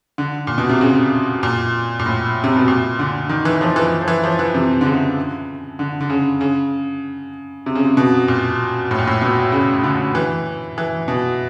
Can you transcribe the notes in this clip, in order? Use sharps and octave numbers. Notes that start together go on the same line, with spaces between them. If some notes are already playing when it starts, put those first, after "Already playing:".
D3
A#2
B2
C3
C#3
A#2
A#2
A2
C3
B2
A#2
D3
D#3
E3
F3
E3
F3
E3
F3
E3
C3
D3
C#3
D3
D3
C#3
C#3
C3
C#3
C3
B2
A#2
A2
A#2
A2
B2
C#3
D3
E3
E3
B2